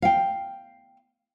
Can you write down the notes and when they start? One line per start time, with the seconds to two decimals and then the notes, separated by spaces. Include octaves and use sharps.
0.02 F5 G5